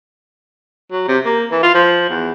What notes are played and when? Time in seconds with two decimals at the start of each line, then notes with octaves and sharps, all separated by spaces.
0.92 F#3
1.08 C3
1.25 A#3
1.51 E3
1.63 F4
1.75 F3
2.10 E2